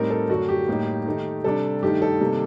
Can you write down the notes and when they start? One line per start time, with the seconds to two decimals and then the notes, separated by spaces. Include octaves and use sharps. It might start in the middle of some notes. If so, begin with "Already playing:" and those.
Already playing: A2 G3 C4 D#4 A#4
0.10 A4
0.29 F#2 D3 A3 D4 F#4
0.49 G4
0.68 A2 G3 A#3 D#4
1.06 D#3 A3 D#4
1.44 C3 G3 D4 A4
1.82 G2 D#3 A3 D#4 G4
2.02 A4
2.21 C3 D#3 G3 A#3